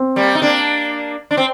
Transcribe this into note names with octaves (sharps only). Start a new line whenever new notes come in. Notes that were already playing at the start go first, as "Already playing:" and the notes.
Already playing: C4
G3 A#3
D#4
A#3 D4
D4
C4